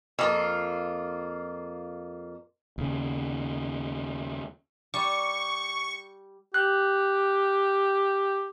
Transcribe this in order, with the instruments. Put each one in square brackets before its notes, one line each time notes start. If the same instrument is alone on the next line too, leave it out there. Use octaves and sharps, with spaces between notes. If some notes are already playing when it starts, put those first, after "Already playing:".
[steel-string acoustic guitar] F2 A#3 F4
[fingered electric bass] D#2 C#3
[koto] G3 [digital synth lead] C#6
[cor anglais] G4 [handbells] F#6